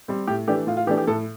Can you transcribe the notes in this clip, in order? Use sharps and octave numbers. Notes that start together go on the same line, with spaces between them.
G3 C4
A2 G4
E3 A3 D4 G4
A2 F4
F4
E3 A3 D4 G4
G4
A2 A4